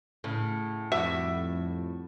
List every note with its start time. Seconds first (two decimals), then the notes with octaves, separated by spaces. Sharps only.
0.24 A2 C#3
0.92 F2 G3 F#4 E5